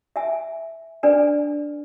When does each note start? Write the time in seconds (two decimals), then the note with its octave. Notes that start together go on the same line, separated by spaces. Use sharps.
0.16 E5 G#5
1.03 D4 B4 D5 G#5